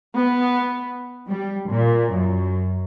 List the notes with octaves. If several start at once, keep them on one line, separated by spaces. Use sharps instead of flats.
B3
G3
A#2
F#2